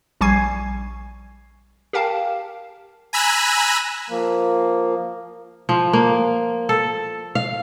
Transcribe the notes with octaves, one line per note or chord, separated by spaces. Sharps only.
A#1 G3 G#5 C#6 G#6 C7
G4 A#4 F5 G5 A5
G#5 A#5 B5 E6 F#6
F3 A#3
F3
A#3
A4
F5